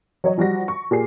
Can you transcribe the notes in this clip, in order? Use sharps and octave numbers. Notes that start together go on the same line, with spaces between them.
F#3 C#5 D#5
F3 G3 F#4 F#5 A#6
C#6
A#2 G4 G#4 C7